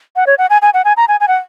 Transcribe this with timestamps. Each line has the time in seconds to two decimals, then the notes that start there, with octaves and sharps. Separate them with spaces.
0.16 F#5
0.27 C#5
0.38 F#5
0.50 G#5
0.62 G#5
0.74 F#5
0.85 G#5
0.97 A#5
1.08 G#5
1.20 G#5
1.28 F#5